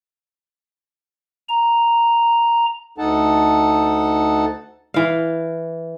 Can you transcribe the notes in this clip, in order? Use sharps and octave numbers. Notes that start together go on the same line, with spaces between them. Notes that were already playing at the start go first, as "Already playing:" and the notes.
A#5
D2 D#4 A4 F#5 A5
E3 F5